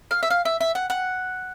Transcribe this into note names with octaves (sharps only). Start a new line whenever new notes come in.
F5
E5
F5
E5
E5
F#5
F#5